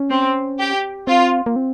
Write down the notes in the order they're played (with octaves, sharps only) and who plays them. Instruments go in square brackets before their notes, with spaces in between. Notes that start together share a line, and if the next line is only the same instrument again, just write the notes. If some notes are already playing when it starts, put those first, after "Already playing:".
Already playing: [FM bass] C#4
[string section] C4
G4
[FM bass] C4 [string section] F4
[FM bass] A#3
C4